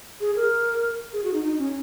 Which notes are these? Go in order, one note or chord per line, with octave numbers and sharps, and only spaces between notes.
G#4
A#4
G#4
F#4
D#4
D#4
C#4